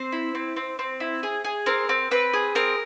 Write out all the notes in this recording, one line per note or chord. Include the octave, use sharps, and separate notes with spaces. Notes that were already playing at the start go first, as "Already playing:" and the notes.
Already playing: C4 C5
E4
C4
C4
C4
E4
G#4
G#4
C4 A#4
C4
C4 B4
G#4
C4 A#4